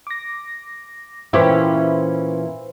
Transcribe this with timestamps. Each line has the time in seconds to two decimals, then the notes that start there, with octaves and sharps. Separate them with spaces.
0.07 D6 A#6
1.33 A#2 E3 C#4 E4 G4 B4 C5 E5